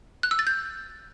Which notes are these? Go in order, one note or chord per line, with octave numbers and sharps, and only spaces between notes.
F#6
E6
A6
G6